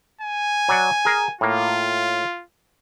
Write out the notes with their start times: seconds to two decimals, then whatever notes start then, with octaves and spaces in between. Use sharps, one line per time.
0.21 G#5
0.69 F#3 D5 F#5
1.05 G#4 A#4
1.41 A2 A#3 F4